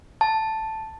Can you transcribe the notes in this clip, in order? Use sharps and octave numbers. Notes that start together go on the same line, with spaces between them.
A5